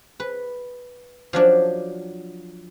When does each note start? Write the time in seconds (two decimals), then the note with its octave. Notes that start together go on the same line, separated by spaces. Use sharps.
0.20 B4
1.33 F3 F#3 D4